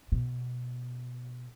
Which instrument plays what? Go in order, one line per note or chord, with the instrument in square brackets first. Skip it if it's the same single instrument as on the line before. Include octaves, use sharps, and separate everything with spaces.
[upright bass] B2